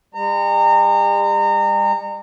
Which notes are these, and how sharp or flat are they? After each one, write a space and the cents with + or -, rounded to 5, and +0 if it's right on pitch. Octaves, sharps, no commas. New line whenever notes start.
G3 +40 A#5 -30